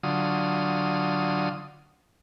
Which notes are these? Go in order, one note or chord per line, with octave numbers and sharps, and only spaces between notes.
D3 F#3 F4 D#6